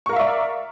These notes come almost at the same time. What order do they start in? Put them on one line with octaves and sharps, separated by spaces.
C#6 A#4 F5 E5 D5